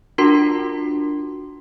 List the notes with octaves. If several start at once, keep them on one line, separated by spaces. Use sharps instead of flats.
D4 F4 F#4 A#4 C6